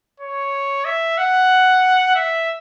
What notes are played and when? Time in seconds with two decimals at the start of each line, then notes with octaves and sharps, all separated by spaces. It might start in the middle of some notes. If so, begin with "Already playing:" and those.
0.20 C#5
0.85 E5
1.18 F#5
2.15 E5